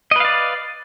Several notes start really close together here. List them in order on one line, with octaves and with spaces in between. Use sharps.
D#5 B4 F5 D5